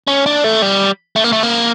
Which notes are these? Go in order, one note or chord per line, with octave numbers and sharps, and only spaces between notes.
C#4
D4
A3
G3
A3
A#3
A3
A#3